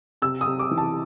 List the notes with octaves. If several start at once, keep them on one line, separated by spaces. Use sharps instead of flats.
C3 E6
D#6
C3
D6
E3
A5